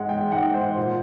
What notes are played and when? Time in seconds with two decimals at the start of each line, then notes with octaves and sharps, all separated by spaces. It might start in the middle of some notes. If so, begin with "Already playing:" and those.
Already playing: G#2 G#3 F#5
0.09 G5
0.32 G#2 F#5
0.54 C5
0.77 A#2